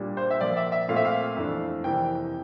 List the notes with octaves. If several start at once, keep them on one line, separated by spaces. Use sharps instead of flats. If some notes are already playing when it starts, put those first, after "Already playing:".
Already playing: A#2 G3 D4
C5
E5
A#2 F3 A#3 D5
E5
E5
A#2 A3 C4 F5
E5
F5
F2 E3 A3 D4
F2 C3 E3 A#3 G5